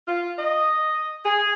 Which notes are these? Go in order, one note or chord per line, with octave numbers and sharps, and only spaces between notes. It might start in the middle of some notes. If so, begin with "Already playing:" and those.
F4
D#5
G#4